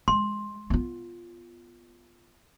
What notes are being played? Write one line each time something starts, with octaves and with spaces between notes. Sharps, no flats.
G#3 C6
B3 F4